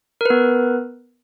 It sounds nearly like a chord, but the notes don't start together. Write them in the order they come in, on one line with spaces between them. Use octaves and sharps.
A#4 B4 B3